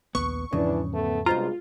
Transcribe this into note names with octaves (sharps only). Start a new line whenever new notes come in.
A#1 D#2 B3 C#6
E2 G#2 C#3 E3 F3 D4
A3 B3
C2 G2 B2 G#3 F4 C5 A#5